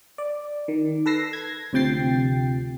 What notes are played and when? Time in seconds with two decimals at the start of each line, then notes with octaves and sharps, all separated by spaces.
0.18 D5
0.68 D#3
1.06 A4 B4 E6 A#6 C7
1.33 G#6 A#6
1.73 D2 C3 F3 G5 A6 C7